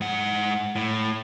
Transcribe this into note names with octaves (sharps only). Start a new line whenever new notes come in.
G#2 F#5
A2